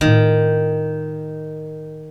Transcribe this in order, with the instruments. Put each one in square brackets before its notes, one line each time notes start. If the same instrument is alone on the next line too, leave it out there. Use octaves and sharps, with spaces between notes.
[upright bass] A2 F4 [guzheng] D#3